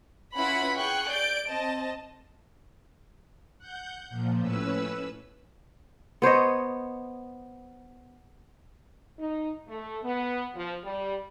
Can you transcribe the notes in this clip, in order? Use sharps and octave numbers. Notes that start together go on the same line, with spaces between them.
C#4 E4 F4 B4 F#5 B5
G#4 G5 C#6 F#6
D5 G6 D7
C4 D#5 A5
F#5 G6
A#2 F3
A2 C#4 B4 E6
B3 C5 C#5 D#5
D#4
A3
B3
F3
G3